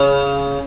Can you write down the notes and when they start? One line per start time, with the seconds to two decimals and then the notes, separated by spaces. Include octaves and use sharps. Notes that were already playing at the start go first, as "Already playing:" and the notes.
Already playing: C#3